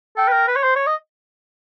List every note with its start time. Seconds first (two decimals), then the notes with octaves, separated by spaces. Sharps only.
0.17 A4 G5
0.28 B4
0.33 A#4
0.48 B4
0.56 C#5
0.64 C5
0.76 C#5
0.87 D#5